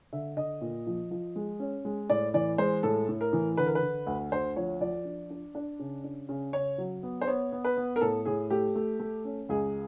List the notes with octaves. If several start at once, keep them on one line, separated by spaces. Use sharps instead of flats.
D3 E5
D3 D#5
A#2
F3
F3
G#3
C#4
G#3
A2 D5
E3 D5
G#3 C5
A2 A4
A2
A#4
E3
D3 B4
A#4
B4
D3
D2
D2 C5
F3 C#5
F3 D5
D4
D4
D4
C#3
D4
C#3
C#3 C#5
F#3
B3
C5
B3 C#5
B3
B4
B3
A#4
A2 A4
A2 G#4
A3 G4
A3
A3
C#4
C#2 G#4